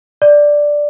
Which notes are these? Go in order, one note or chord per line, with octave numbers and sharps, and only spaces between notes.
D5